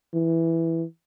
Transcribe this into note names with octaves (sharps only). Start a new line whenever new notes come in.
E3